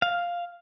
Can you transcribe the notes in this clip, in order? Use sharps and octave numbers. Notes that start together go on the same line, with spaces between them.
F5